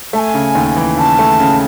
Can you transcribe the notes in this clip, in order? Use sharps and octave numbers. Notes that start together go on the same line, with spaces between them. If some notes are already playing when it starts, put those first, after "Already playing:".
A3 G#5 A5
C#3
D#2
E3
C#3 A5
A3
C#3